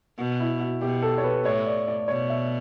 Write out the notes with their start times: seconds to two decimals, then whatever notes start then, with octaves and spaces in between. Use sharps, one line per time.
0.18 B2 F#4
0.40 E4
0.60 F#4
0.81 B2 G4
1.02 A4
1.18 C#5
1.24 B4
1.45 A2 C#5
1.66 D5
1.88 D5
2.08 B2 C#5
2.30 E5